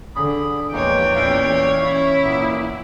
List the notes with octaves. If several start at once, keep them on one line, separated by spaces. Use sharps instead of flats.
D3 G#4 B5
A#1 E2 E3 G#3 A#3 C#5 G5
A#2 C#4 D5 E5 F5
C#4 E4
A#2 A#3 B3